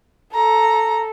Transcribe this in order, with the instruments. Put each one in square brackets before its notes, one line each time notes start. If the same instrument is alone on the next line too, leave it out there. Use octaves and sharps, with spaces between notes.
[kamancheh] A4 [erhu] A#5